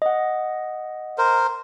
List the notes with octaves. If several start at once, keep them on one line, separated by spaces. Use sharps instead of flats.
D#5 F#5
A#4 C5